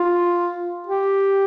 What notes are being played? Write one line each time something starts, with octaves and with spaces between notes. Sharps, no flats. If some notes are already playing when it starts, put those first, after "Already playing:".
Already playing: F4
G4